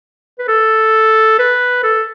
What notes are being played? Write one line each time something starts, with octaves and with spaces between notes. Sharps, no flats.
B4
A4
B4
A4